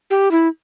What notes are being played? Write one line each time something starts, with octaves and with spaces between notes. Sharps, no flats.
G4
E4